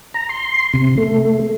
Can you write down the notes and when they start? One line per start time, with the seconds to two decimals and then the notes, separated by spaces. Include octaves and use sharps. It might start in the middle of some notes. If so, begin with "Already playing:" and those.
0.14 A#5
0.29 C6
0.74 C3
0.98 A3